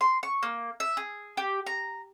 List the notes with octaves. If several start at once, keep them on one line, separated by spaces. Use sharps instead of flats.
C6
C#6
A#3
E5
G#4
G4
A#5